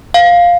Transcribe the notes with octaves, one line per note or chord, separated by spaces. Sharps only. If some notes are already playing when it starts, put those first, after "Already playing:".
F5